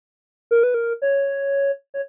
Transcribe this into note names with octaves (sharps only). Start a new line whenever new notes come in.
A#4
B4
A#4
C#5
C#5